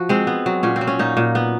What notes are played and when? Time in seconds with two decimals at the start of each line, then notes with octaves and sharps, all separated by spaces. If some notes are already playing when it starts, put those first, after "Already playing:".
Already playing: F3 F#4
0.09 G#3 C4
0.27 B3
0.46 F#3
0.63 A#2 C#4
0.76 C4
0.81 F#3
0.87 C#4
0.99 A#2 D#4
1.17 A#2
1.35 B3